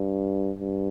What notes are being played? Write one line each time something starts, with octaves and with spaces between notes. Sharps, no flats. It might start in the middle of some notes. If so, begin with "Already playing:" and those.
Already playing: G2
G2